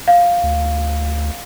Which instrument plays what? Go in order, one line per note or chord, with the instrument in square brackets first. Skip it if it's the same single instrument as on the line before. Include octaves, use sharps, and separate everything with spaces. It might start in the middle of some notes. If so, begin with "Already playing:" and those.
[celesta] F5
[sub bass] D2